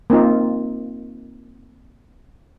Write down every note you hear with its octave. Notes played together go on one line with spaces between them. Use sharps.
A#3 C4 D#4 F4